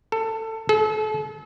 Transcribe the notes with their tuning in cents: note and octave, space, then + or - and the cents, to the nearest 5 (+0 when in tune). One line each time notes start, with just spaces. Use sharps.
A4 +20
A4 -40